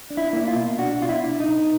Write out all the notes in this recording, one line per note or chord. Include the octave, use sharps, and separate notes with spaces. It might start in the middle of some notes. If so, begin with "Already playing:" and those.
D4
E4
A#3 E4
F4
B2
D4 F#4
B2 F4
E4
D4
D#4
B2